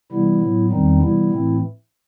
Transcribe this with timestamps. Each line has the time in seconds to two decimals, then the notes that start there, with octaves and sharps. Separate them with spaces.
0.12 C3 E3 G3 B3 E4
0.42 A2 F#3 B3
0.72 E2 D#3 G3 C4 D#4
1.01 C3 E3 G3 B3 E4
1.31 A2 E3 A3 C4